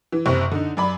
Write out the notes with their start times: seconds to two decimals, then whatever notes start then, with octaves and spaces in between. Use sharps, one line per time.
0.12 E3
0.26 F#1 C3 C4 C#6
0.51 D3 D#4
0.77 F#2 D5 B5